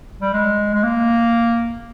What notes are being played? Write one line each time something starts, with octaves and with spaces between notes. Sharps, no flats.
G3
G#3
G#3
A#3